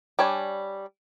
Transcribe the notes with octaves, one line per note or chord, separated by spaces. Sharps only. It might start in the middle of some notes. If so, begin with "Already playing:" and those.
G3 D4 C#5 G#5